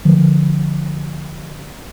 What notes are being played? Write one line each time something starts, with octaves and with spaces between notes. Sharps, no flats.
D3 F3